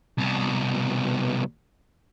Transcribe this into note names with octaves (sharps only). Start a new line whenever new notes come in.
C2 B2